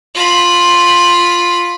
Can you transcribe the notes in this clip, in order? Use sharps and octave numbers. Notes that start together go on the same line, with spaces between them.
F4 B5